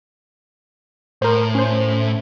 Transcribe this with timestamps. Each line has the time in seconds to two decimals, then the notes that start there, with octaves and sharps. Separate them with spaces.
1.22 A2 A#4 C5
1.55 C#4 C5